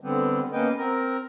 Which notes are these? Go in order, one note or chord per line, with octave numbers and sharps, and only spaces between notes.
D3 G3 B3 C4
A#3 B3 C#4 B4 D#5 G5
C4 A#4 A#5